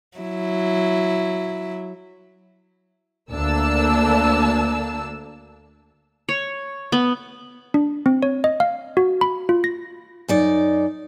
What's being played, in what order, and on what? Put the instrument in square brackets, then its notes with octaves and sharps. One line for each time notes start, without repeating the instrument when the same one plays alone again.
[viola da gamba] F#3 E4
[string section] D2 A#3 D4 A5 E6
[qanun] C#5
B3
[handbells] D4
C4
C#5
D#5
F5
F#4
B5
F4
A#6
[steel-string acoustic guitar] F#2 D#4 D5